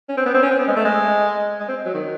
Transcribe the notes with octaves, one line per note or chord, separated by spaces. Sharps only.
C#4
C4
B3
C4
C#4
C4
B3
G#3
A3
G#3
G#3
C4
F#3
D#3